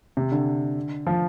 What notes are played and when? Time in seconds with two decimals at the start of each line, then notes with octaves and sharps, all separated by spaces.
0.17 C3
0.32 D3
1.07 F3